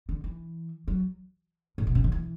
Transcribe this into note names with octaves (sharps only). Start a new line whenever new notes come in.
D3
E3
F#3
A2
B2
C#3
D3
E3